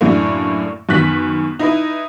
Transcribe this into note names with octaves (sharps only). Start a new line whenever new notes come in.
F#2 A2 D3 A3 A#3
F#2 D#3 B3 F#6 B6
D#4 E4 B4